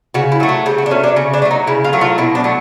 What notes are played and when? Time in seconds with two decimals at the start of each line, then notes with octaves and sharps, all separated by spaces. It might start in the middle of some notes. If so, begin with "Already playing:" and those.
0.14 C#3 F#4
0.32 E4
0.40 F#3 A3
0.49 F#4
0.66 C#3 G4
0.78 F#4
0.86 D4
0.91 F#3 A3 C#4
1.04 D4
1.16 C#3 C#4
1.34 D4
1.42 A3
1.45 F#3
1.51 D#4
1.67 C#3 E4
1.84 F4
1.93 F#3 A3
2.01 F4
2.18 B2 E4
2.35 D4
2.44 F#3 A3